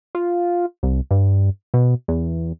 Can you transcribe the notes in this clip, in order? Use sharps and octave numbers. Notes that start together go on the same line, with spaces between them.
F4
C2
G2
B2
E2